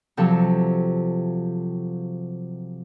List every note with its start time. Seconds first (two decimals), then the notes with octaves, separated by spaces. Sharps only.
0.17 C3 F3 F#3 A4